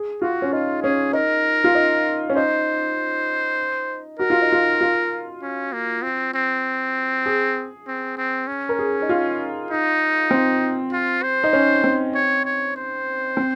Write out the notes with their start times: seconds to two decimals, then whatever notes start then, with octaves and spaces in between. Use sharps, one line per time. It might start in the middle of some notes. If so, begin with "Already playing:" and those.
Already playing: G#4
0.22 F4 F#4
0.42 C#4
0.53 D#4 F4
0.83 C#4 G#4
1.13 D#4 A#4
1.64 F4
1.75 D#4
2.30 C#4
2.36 D#4 C5
4.19 F#4 A#4
4.30 F4
4.42 D#4
4.52 F4
4.81 F4
5.42 C#4
5.73 A#3
6.03 C4
6.34 C4
7.26 G#4
7.87 C4
8.17 C4
8.47 C#4
8.69 A#4
8.79 G#4
9.02 D#4
9.09 F4
9.71 D#4
10.31 C4
10.93 F4
11.23 C5
11.44 D#4
11.53 C#4
11.84 C4
12.15 C#5
12.45 C#5
12.76 C5
13.37 C4